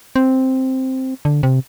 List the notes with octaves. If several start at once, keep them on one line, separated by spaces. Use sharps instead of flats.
C4
D3
C3